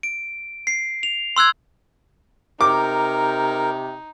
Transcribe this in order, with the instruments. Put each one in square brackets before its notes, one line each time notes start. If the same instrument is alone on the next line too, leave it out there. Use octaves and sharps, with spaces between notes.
[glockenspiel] D7
C7
F7
C6 E6 F#6 G#6
[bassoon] C3 [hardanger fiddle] D#4 [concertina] A#4 [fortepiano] D6